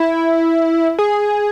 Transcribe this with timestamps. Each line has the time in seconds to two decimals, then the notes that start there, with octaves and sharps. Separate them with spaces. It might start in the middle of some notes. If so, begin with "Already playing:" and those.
Already playing: E4
0.99 G#4